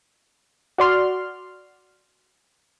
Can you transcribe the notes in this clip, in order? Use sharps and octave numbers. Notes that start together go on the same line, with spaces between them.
F#4 D5 C6 F6